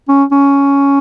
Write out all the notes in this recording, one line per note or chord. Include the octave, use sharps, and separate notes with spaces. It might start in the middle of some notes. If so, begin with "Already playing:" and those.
C#4
C#4